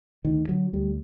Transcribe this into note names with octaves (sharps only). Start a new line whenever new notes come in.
D2 D#3
D3 F#3
D2 G3